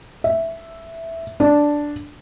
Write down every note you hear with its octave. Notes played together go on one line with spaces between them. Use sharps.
E5
D4